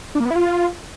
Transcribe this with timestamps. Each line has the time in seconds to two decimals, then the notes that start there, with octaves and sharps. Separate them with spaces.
0.15 D4
0.20 A#3
0.25 B3
0.31 E4
0.36 F4